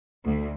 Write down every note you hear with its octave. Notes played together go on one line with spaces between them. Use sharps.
D2